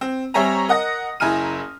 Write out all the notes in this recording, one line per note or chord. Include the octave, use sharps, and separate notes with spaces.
C4
G3 C4 C#5 E5 G#5 A#5
A#4 D#5 F#5 D#6 A#6
F#1 E4 G#5 A#5 F6 D#7